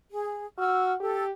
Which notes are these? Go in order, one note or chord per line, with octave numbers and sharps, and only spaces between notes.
G#4
F#4 E6 F6
G4 A4